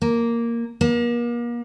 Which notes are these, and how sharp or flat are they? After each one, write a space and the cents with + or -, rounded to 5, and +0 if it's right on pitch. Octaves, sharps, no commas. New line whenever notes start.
A#3 +0
A#3 +40